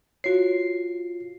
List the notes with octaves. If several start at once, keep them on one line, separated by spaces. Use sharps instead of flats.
F4 F#4 C#5 C7